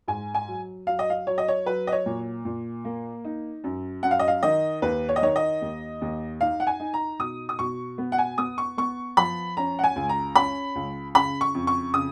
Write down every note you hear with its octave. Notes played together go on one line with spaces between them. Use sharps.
G#2 G#5
G#5
F#3
F#3 F5
D#5
F5
F#3 C#5
D#5
C#5
F#3 B4
D#5
C#5
A#2
A#2
A#3
D#4
F#2
F#2 F#5
F5
D#5
F5
D#3 D#5
D#2 B4
C#5
D#5
D#3 C#5
D#5
D#2
D#2
D#4 F5
F#5
G#5
D#4
A#5
B2 D#6
D#6
B2 C#6
B3
F#5
G#5
B3 D#6
C#6
B3 C#6
F3 B5
C#4 A#5
F#5
G#5
C#2
A#5
C#4 B5
C#2
C#3 B5
C#6
F2
C#6
C#3 D#6